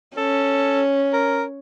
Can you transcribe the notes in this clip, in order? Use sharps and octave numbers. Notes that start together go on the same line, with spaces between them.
C#4 A4
A#4